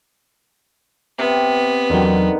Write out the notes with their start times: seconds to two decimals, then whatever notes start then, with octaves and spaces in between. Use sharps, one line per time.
1.19 C3 B3
1.90 E2 D3 D#3 F#3